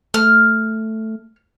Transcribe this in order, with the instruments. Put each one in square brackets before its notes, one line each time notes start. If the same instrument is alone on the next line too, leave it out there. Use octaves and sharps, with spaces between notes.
[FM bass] A3 [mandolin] F6